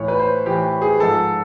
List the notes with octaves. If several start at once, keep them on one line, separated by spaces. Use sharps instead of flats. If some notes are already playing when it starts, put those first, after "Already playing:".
Already playing: A2 E3 C#5
B4
C5
A2 E3 G4
G#4
G#2 F3 A4